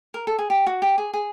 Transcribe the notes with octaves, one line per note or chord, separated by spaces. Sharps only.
A#4
A4
G#4
G4
F#4
G4
G#4
G#4